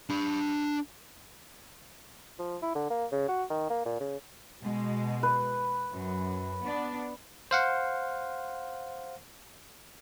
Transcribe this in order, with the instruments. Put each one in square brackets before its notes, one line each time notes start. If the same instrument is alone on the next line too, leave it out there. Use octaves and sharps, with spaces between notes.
[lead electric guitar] D4 B5
[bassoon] F3
E4
D3
A#3
C#3
F#4
D#3
A#3
A#2
C#3
[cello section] B2 G#3
[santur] B4
[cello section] F#2
B3 D4
[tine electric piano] C5 F5 F#5